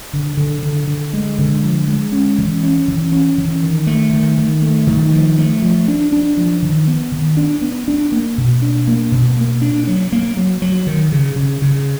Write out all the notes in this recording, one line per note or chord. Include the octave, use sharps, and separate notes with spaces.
D3
D3
D3
D3
G#3
D3
F3
G#3
C#4
E3
C#4
E3
C#4
E3
D#3
A3
D#3
D#3
A3
D#3
F3
A3
F3
D4
D4
F3
D#3
B3
D#3
D4
B3
D4
A#3
B2
D4
A#3
B2
A#3
D4
F#3
A#3
F#3
F#3
D#3
C#3
C#3
C#3